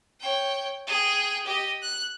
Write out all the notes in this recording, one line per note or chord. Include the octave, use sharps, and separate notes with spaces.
C#5 G5
G#4 G5
G4 D#5
F#6